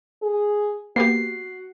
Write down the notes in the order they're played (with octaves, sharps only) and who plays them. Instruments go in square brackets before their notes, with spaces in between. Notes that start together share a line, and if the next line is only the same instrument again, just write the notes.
[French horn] G#4
[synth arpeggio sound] A#3 B3 G4 [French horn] F#4 [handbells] C7